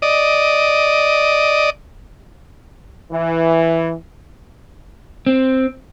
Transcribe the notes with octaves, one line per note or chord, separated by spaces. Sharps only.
D5 D#5
E3
C4